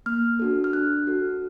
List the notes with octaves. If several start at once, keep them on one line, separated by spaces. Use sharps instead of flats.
A#3 F6
D4 F#4 A4
F6
D4 F#6
F#4 A4